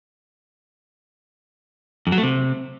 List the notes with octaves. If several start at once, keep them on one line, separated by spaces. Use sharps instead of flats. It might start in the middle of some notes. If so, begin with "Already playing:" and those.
F2
F#3
A3
C3